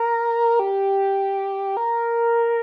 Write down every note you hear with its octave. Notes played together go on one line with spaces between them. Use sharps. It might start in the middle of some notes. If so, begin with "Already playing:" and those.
Already playing: A#4
G4
A#4